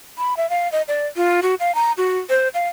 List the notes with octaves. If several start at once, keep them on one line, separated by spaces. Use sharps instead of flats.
B5
E5
F5
D#5
D5
F4
F#4
F5
A#5
F#4
C5
F5